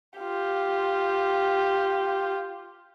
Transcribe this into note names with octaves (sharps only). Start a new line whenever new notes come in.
F4 G4